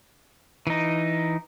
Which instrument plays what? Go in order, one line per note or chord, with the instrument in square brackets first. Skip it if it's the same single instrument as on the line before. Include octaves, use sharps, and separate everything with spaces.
[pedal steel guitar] E3 D#4